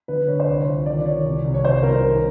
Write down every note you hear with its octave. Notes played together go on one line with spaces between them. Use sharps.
D3 B4
D3 C#5
C5
C2 C#5
F3
D#3 D5
D#3 C#5
C2
C2
C#5
C2 C5
C2 A#4
D#3